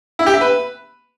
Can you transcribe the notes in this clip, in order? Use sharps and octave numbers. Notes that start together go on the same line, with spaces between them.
E4
G4
E5
B4